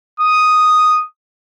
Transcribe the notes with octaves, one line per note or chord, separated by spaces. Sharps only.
D#6